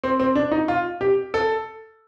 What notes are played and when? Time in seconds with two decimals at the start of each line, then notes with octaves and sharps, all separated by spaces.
0.04 C4
0.20 C4
0.35 D4
0.52 D#4
0.68 F4
1.01 G4
1.34 A4